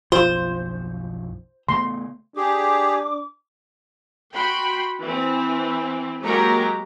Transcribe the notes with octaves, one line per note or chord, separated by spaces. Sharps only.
F#1 B1 F3 F4 C5
C#3 A3 B3 C6
D4 G4 G#4 D6
F#4 G5 B5 C6
E3 C4
F#3 G#3 A#3 G4 A#4 A#5